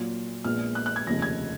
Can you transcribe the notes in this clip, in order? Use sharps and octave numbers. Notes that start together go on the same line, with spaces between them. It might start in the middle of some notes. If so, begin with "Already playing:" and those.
Already playing: A#2 F#3 A#3 F4
A#1 A#2 G#3 B3 F4 F6
F#6
F#6
G#6
F1 D#2 C#3 F3 A#6
G#6